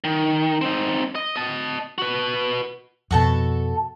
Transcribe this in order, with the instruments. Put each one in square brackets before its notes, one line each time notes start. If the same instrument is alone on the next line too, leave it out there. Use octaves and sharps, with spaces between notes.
[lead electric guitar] D#3
C4 D#4
D#5
D#5 A5
F#4 B4
[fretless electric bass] F2 B2 [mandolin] F#4 A4 A5